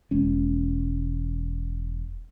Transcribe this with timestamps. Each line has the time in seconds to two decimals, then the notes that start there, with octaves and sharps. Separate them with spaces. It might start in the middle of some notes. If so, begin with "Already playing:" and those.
0.11 E1 G#3 C#4